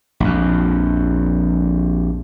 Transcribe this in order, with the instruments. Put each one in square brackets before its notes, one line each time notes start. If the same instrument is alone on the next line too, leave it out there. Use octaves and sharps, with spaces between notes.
[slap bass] A#1 F2